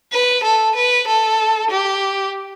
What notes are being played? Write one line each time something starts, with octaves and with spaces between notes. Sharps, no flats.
B4
A4
B4
A4
G4